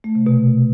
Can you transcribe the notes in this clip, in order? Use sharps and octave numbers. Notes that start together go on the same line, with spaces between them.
A3
C3
B2